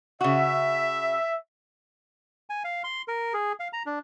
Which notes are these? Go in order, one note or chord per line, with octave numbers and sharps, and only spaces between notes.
C#3 F#4 E5
G#5
F5
C6
A#4
G#4
F5
A#5
D4